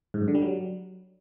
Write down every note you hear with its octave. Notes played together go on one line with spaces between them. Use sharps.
G#2
F#2
D3
G3
F#3